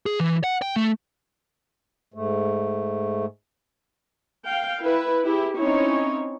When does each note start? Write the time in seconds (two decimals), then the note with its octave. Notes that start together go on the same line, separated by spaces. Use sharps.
0.06 G#4
0.20 E3
0.44 F#5
0.62 G5
0.76 A3
2.14 G#2 A3
4.45 F5 G5
4.82 E4 B4
5.26 E4 G4 G#4
5.57 C4 C#4 D#4 E4 C#5